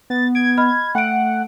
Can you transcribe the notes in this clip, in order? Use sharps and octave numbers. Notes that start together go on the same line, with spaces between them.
B3 A6
G#6 D7
D#5 B5 F6
A3 F#5 G5 D7